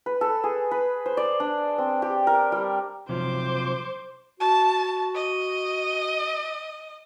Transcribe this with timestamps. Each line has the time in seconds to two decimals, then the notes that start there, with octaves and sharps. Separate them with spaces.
0.06 B4
0.21 A4
0.44 G#4
0.71 B4
1.06 C5
1.17 D5
1.40 D4
1.78 C4
2.02 G4
2.27 A#4
2.52 G3
3.09 C3 F3 F#3 C5 D6
4.40 F#4 A5
5.14 D#5